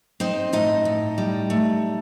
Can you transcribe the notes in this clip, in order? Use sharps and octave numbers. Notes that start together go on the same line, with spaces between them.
C4 D#4 C5
A2 D#4 D#5
A2
G3
A3